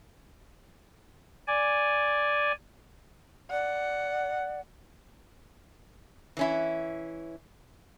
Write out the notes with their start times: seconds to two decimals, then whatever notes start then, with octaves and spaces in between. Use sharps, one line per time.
1.47 D5 G#5
3.51 D5 F#5
6.37 E3 C#4 E4